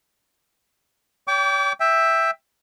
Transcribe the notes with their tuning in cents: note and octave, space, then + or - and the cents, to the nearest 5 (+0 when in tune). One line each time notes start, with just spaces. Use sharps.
C#5 +40 G5 +0 D6 -35
E5 +0 G5 +15